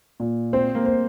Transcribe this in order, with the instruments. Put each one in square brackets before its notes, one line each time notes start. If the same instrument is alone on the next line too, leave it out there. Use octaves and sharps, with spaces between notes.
[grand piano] A#2
[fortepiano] C4 [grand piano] C5
[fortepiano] A#3
[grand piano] C5